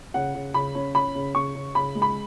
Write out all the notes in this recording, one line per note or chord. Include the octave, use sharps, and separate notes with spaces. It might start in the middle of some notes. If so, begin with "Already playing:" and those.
C#3 F#5
C#3
C#3 B5
C#4
C#4 B5
C#3
C#3 C#6
C#3
C#3 B5
G#3
B5